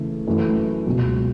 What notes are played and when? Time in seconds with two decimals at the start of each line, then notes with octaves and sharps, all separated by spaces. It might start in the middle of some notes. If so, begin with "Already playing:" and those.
Already playing: C#3 E3 A3
0.27 F#2 E3 A3
0.86 C#2 B2 F#3